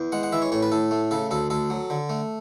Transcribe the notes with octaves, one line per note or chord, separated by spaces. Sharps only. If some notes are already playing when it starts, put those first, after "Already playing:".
Already playing: E2
G#3 F#5
F#5
E3 E5
C#5
A2 C#5
B4
A2 A4
A3
C#3 A4
D2 A4
D2 A4
F#3
D3
A3